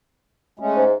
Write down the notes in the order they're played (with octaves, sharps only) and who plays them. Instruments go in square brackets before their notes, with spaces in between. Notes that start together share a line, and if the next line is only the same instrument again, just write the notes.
[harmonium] G#3 A3 C#4
[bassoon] G#2